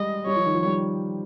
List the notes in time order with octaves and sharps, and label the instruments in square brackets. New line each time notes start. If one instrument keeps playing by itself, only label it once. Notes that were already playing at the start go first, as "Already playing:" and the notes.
Already playing: [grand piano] G3 G#3 [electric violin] D#5
[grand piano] G3 [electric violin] C#5
[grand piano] F3
D#3
F3
G3